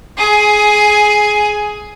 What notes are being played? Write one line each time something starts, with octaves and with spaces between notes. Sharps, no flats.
G#4 G#5